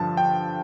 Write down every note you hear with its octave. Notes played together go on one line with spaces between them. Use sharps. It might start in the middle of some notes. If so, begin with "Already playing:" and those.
Already playing: G2 D3 F3 A5
G5